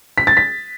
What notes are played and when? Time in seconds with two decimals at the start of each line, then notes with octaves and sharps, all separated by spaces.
0.18 B6
0.27 A6
0.37 B6